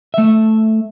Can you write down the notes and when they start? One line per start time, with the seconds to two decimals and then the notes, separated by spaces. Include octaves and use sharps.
0.14 A3 E5